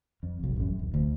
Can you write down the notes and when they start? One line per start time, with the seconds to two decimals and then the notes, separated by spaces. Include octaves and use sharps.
0.23 F2
0.39 F1 B1
0.56 A1 F#2
0.79 D1
0.94 D2